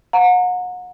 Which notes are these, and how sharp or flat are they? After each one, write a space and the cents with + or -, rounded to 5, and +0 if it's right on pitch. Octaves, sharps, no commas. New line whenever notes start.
F#5 -35 A#5 -25